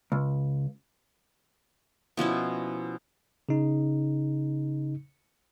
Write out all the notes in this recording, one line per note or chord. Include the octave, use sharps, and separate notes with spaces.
C#2
B2 F3 C#4 E4
C#3 D#4